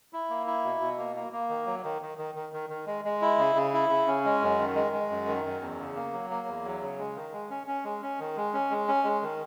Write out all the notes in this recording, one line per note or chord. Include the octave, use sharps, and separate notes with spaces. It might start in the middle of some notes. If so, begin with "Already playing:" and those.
E4
A#3
E4
B2
B2
A#3
A#3
A#3
D#3
F#3
D#3
D#3
D#3
D#3
D#3
D#3
G#3
G#3
E4
C#3
C#3
E4
C#3
C#4
G#3
F#2
D#3
G#3
G#3
F#2
D#3
F#2
E2
C#3
A#3
F#3
A#3
E2
F#3
C#3
G#3
D#3
G#3
C#4
C#4
G#3
C#4
D#3
G#3
C#4
G#3
C#4
G#3
D#3